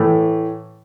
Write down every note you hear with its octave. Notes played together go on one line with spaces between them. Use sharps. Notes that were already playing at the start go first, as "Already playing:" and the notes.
Already playing: A2 E3 A3